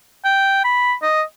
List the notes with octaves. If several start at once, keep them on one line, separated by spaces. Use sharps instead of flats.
G5
B5
D#5